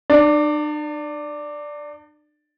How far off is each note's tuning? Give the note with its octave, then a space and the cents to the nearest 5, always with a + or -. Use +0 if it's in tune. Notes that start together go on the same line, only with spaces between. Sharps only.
D4 +45 D5 +0